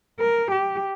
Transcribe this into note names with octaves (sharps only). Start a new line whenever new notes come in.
A#4
G4